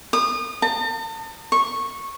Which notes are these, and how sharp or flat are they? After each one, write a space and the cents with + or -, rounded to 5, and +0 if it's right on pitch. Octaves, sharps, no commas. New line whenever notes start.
D#6 -30
A5 +40
C#6 -15